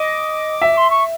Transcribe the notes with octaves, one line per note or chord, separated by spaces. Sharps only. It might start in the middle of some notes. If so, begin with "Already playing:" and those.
Already playing: D#5 D6
E5
C6
C#6